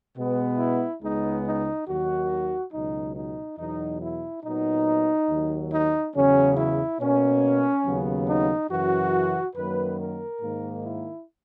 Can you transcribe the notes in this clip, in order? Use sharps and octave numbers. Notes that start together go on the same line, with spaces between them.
B2 G#3 B3
E4
C#2 C#3 G#3 B3 D#4
D#4
D#2 D#3 F#3 F#4
C#2 B2 F#3 D#4
D#4
E2 B2 F#3 D#4
E4
A#2 F#3 B3 D#4
D#2 D#3 F#3
D#4
E2 C#3 F#3 C#4
E4
B2 A#3 C#4
D#2 C#3 F#3 B3
D#4
F#2 C#3 E3 F#4
F#2 D#3 F#3 A#3 B4
A#4
G#2 D#3 A#3
E4